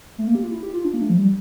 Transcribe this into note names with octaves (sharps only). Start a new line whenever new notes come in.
A3
A#3
G4
F4
E4
G4
F4
D4
A#3
A3
F3
G3